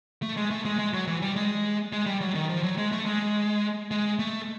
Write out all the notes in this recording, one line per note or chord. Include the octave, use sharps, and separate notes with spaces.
A3
G#3
A3
G#3
G#3
F#3
E3
G3
G#3
G#3
G3
F#3
D#3
F3
F#3
G#3
A3
G#3
G#3
A3